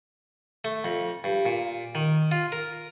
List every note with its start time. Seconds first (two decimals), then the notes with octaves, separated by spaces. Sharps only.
0.64 A3
0.84 F2
1.24 G2
1.45 A#2
1.95 D#3
2.31 F4
2.52 A#4